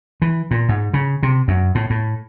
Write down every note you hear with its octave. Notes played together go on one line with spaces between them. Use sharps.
E3
A#2
G#2
C#3
C3
F#2
A2
A2